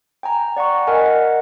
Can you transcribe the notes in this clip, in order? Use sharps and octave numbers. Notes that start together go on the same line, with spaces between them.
G5 G#5 A#5
D5 F#5 A#5 C#6
A#4 D#5 F#5 G#5